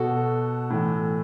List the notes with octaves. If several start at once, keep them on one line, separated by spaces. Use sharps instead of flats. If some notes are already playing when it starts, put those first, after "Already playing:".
Already playing: B2 F#4 A4
A2 E3